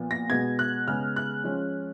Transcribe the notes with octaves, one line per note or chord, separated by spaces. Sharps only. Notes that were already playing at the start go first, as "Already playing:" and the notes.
Already playing: A#2 F3 B3
A#6
B2 G#3 B3 G#6
F#6
C#3 G#3 B3 F6
F#6
F3 G#3 C#4